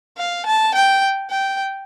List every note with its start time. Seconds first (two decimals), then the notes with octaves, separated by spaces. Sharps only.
0.18 F5
0.46 A5
0.74 G5
1.30 G5